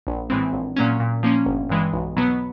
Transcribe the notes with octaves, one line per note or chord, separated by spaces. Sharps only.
A#1
A2 E3 G#3 C4
A#1
A#2 F#3 A#3 C#4
A#2
F3 A#3 C#4
G1
G2 E3 G#3
B1
B2 F#3 B3